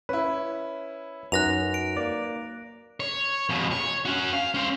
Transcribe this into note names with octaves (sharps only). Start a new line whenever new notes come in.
C#4 E4 B4
F#2 D#4 B4 F#6 A#6 F7
D7
A#3 D5
C#5
F2 B2
C#5
C#4 F#4
F5
C#4 C5